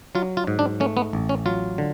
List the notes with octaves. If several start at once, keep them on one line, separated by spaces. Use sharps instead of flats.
F#3 F4
F4
G#2
D4
A3 C#4
B3
A1
C#4
F#3 F4
D3